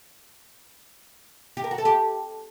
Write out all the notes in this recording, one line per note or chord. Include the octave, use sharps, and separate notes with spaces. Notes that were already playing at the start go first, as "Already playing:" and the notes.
G4
A#4
F#4
A4
G4